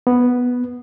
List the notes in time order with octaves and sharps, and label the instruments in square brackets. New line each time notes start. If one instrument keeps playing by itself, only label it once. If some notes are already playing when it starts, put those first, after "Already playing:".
[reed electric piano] B3